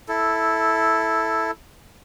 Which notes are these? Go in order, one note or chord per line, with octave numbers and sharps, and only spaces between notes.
E4 A4